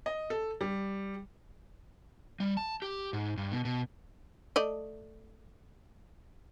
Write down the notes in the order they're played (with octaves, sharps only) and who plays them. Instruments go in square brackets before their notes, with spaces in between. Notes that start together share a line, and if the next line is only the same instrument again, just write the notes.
[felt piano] D#5
A4
G3
[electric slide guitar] G3
A5
G4
G#2
G2
B2
B2
[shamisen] A3 D5 D#5